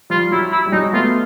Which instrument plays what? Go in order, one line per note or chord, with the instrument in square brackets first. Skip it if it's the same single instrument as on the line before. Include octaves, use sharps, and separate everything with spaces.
[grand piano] F3 G3 [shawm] F4
[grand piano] F#3 [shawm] E4
[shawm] E4
[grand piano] G3
[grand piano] F#3 G#3 [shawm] D#4
[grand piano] A3 B3 [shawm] F4